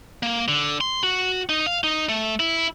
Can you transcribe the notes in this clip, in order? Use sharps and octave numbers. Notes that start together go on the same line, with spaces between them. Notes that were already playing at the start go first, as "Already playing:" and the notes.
A#3
D3
C6
F#4
D#4
F5
D#4
A3
E4